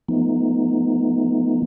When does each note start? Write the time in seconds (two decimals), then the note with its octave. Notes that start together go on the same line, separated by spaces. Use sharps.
0.08 F3 A3 B3 D#4